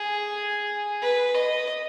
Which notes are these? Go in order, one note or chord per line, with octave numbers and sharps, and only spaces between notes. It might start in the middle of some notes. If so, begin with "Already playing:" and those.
Already playing: G#4
B4
D#5